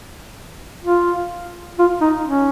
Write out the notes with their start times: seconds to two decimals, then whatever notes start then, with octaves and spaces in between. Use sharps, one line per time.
0.84 F4
1.79 F4
2.01 D#4
2.25 C#4